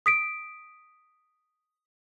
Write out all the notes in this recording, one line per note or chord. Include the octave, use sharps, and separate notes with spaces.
D#6 B6 D7